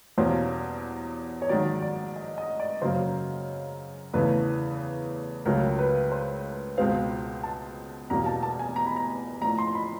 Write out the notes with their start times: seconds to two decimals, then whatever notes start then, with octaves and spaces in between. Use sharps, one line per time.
0.17 E2 B2 G3 A#3 C#4 C5
1.42 C#5
1.49 A#1 G#2 D#3 F#3 D5
1.82 D5
2.16 D#5
2.38 D#5
2.60 D5
2.82 F#2 C#3 F#3 A#3 C5
4.13 E2 C#3 E3 A3 B4
5.45 C#2 C#3 F#3 A3 A#4
5.79 B4
6.12 C5
6.78 C#2 B2 G#3 C4 F5
7.43 A5
8.10 E1 E2 B2 G3 A#3 A#5
8.26 A5
8.43 A5
8.59 G#5
8.76 A#5
8.86 B5
8.96 A#5
9.41 A#1 A2 F3 A#5
9.58 C6
9.75 B5